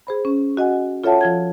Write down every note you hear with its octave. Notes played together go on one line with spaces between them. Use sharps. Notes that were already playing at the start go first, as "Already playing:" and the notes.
G#4 C5 B5
C#4
F#4 D#5 F#5 G#5
F4 A4 C#5 E5 F#5 A5
F3 F4 G#6